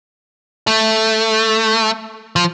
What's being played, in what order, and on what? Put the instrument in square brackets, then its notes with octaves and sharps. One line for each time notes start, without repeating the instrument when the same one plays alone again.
[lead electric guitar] A3
F3